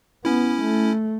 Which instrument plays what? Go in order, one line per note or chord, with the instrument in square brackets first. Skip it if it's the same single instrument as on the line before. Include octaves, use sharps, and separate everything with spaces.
[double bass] B3 [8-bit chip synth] C#4 E4
[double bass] A3